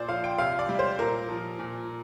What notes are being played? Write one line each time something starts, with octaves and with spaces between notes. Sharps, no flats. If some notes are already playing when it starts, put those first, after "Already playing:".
Already playing: A#2 C5 D5
F3 F5
G5
C3 F5
D5
G3
C5
A#2 A#4
F3
A#2